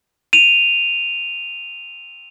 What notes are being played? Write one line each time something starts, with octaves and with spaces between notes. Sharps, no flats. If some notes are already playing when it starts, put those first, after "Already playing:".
D#7 F7